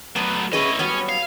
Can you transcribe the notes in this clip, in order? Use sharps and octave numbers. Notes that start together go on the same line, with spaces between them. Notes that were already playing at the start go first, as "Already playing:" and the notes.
F#3 A3 B3
C#4 E4 G#4 B4 D#5
F#3 G3 B3 C#4
F5